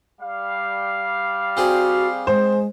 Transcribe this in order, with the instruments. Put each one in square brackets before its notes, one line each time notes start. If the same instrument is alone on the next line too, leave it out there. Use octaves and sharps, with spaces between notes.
[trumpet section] G3 F5
[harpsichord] C4 G#4 D5 [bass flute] F#4
[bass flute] G#3 [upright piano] C5